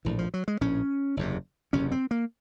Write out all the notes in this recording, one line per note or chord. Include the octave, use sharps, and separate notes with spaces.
A#1 A2 E3
F3
F#3
G#3
A#1 A2 C#4
F#1 E2 C3
F#1 E2 C3 C#4
C4
A#3